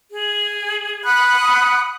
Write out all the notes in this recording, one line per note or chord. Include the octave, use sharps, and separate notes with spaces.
G#4
F#5 B5 D#6 F#6